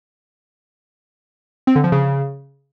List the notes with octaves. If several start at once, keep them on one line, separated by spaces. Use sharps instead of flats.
C4
D3
F3
C#3